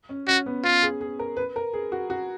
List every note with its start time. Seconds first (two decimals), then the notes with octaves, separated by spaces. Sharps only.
0.09 C#4
0.27 C#4 F#4
0.46 B3
0.64 B3 F4
0.83 G#4
1.01 G#4
1.19 A#4
1.37 B4
1.56 A#4
1.73 G#4
1.92 F#4
2.10 F#4